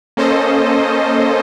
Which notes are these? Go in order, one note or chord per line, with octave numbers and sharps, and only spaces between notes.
A#3 C#4 A4 C5 D#5